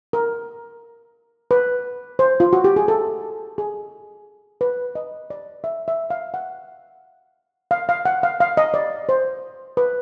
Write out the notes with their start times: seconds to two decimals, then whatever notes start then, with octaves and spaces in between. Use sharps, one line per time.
0.13 A#4
1.51 B4
2.19 C5
2.40 F4
2.53 F#4
2.64 G4
2.76 G#4
2.88 A4
3.58 G#4
4.61 B4
4.95 D#5
5.30 D5
5.64 E5
5.88 E5
6.10 F5
6.34 F#5
7.71 F5
7.89 F5
8.05 F#5
8.23 F5
8.40 F5
8.57 D#5
8.74 D5
9.09 C5
9.77 B4